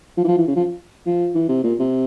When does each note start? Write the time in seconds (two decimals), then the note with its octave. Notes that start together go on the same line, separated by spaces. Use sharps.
0.17 F3
0.24 E3
0.28 F3
0.38 E3
0.48 C#3
0.56 F3
1.06 F3
1.35 E3
1.49 C3
1.64 A#2
1.79 C3